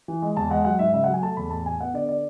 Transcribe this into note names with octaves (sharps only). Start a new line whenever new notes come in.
E3
G#3
E2 A5
G#3 F#5
F#3 F#5
G#2 E5
C#3 E5
F#5
F#3
G#5
A3 A5
E2 B5
A2 A5
A2 G#5
B3 F#5
D3 D5
D5